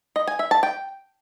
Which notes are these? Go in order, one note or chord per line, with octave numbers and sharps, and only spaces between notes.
D#5
G#5
E5
A5
G5